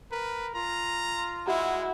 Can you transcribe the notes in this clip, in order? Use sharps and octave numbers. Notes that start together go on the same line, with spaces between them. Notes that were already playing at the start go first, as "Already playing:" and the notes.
A#4 B4
F4 A#5
G#3 E4 F#4